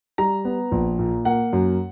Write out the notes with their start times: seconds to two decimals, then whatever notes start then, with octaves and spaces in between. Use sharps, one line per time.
0.18 G3 A#5
0.45 B3
0.72 A#1
0.99 A#2
1.25 A#3 F#5
1.53 F#2